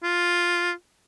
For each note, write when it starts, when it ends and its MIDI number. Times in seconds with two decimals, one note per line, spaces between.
0.03 0.72 65